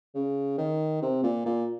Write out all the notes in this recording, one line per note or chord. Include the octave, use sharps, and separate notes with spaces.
C#3
D#3
C3
A#2
A#2